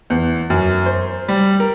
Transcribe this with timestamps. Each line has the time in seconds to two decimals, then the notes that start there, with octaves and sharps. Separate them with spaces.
0.10 E2
0.50 F#2
0.86 C5
1.29 G3
1.60 A#4